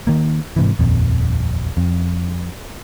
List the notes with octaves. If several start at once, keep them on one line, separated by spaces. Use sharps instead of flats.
D#3 A#3
G#2 C3 E3
D#1 A#1 F2
F2